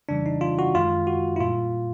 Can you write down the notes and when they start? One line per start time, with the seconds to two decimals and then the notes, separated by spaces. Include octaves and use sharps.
0.09 F2 C#3 E3 G3 D4
0.26 D#4
0.41 F4
0.59 F#4
0.75 F#2 D#3 G#3 F4
1.07 F#4
1.36 E4
1.40 A#2 G3 F4